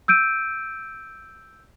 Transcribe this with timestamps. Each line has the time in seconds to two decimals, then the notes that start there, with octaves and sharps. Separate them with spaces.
0.08 E6 G6 D7 D#7